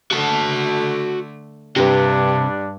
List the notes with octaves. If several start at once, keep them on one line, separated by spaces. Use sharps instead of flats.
D3 A3 F#4 A5
G2 C3 G3 D4 G4 B4